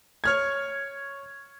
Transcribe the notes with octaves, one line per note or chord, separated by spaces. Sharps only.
C#5 F6 G#6